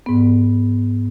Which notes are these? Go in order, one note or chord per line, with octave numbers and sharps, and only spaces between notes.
G#2 B3